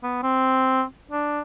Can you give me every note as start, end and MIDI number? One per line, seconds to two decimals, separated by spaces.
0.03 0.21 59
0.23 0.83 60
1.11 1.40 62